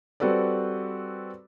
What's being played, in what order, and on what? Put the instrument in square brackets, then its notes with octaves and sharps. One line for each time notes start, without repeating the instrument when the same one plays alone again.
[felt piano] G3 C4 F#4 A4 B4 D5